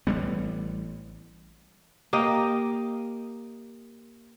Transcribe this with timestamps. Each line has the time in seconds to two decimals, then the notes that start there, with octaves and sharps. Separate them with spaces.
0.07 A1 G3 B3
2.13 A#3 G4 D#5